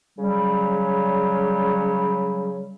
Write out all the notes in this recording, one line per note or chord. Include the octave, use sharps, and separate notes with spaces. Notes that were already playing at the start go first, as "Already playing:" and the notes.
C#3 F#3 G3